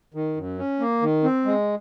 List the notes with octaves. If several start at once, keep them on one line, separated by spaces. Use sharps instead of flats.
D#3
F#2
C#4
A#3
D#3
C4
G#3